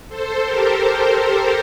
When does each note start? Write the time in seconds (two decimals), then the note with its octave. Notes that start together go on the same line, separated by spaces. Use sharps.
0.09 A4 C5
0.44 G4 A#4